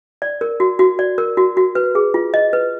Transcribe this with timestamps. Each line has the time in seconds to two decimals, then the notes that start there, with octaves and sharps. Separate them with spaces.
0.22 D5
0.41 A#4
0.60 F#4
0.79 F#4
0.99 D5
1.18 A#4
1.37 F#4
1.57 F#4
1.75 B4
1.95 G#4
2.14 F4
2.34 D#5
2.53 B4